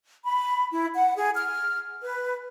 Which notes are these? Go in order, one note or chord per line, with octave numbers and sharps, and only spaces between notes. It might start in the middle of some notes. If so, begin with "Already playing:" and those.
B5
E4
F#5
G#4
F6
B4